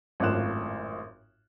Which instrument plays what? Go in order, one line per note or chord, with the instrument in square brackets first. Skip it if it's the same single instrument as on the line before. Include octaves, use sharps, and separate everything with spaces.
[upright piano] G#1 F#2 A2 F4 F#6 E7